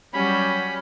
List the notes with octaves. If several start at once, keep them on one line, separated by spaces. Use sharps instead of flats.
F#3 G3 C#4 F#4 B5